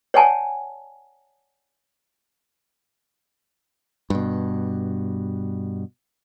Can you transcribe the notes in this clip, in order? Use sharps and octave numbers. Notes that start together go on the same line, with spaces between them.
C#5 D5 F#5 G#5 A5
G2 B2